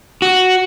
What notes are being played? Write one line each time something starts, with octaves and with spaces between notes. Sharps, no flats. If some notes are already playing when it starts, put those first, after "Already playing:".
F#4